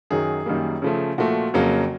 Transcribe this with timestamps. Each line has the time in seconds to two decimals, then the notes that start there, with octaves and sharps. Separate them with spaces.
0.10 F#2 D#3 F#3 G#4
0.46 F#2 D#3 G3 A#3
0.82 C#3 F3 A3
1.18 A#2 F3 A3 F#4
1.54 F2 C#3 F#3 A#3